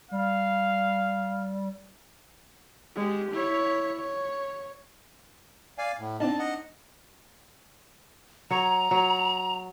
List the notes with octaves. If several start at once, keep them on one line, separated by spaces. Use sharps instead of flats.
G3 F5
G#3 G4
E4 C#5
C#5
D5 F5 G#5
A2
C4 D4 D#4 A5
D#5 F#5
F#3 C#5 A#5
F#3